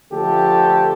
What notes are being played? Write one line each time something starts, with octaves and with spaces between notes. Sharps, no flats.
D3 F3 A3 G4 A4